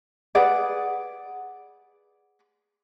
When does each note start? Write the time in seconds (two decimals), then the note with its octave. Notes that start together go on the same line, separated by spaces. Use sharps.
0.35 G#4 B4 D5 F#5